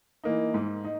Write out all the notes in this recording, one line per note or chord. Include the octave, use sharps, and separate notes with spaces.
E3 A#3 D#4
G#2
D#4